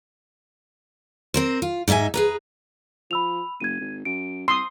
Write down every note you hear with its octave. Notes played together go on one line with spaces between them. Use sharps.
C4 A#4 C5
F4
G#2 B3 D#4 E5 G#5
G#4 B4 A#5
F3 B5 E6 F7
F#1 G#6 D#7
G#1
F#2 D7
C2 C6 D#6 E6